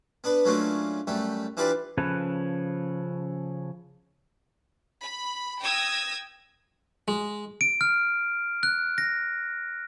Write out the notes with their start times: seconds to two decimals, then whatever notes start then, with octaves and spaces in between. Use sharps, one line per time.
0.24 B3 D4 B4
0.45 F#3 A3 A#3 C#4 D4 F4
1.07 F#2 G3 A3
1.57 E3 D4 F4 G4 B4 D5
1.98 C#3 F3 C#4 A4 B4
5.02 B5
5.63 G5 D#6 E6 G#6 A#6
7.08 G#3
7.61 D7
7.81 F6
8.63 F#6
8.98 A#6